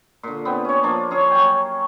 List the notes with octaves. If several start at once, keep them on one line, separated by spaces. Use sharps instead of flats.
A#2 D3
B3 C4
C#4 C#5
F3 A#3 D4 F4
C#4 G#4 C#5
F#3 G5